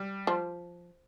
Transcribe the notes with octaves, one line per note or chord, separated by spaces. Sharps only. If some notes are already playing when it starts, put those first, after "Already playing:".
Already playing: G3
F3